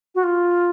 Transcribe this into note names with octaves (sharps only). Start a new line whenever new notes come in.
F#4
F4